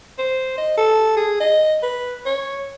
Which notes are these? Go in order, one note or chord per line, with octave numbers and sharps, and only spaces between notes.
C5
D#5
A4
G#4
D#5
B4
C#5